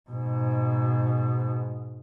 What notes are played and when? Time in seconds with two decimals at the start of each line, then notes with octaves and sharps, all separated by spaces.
0.10 G#2 B2